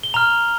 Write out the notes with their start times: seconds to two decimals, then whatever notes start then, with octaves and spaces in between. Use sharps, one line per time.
0.03 G7
0.14 A#5 F6 F7